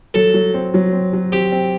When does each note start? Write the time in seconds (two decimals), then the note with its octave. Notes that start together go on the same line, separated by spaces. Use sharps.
0.14 F#3 A4
0.34 F#3
0.54 C4
0.74 F#3
0.93 C4
1.13 F#3
1.32 C4 G4
1.52 C4